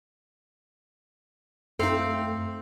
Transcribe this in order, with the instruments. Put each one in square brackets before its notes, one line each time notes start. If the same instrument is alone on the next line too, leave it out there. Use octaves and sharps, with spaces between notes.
[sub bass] F#2 [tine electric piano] A3 [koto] C4 F5 [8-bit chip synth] D#4 A4